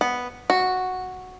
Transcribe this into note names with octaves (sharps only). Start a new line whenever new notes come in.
B3
F#4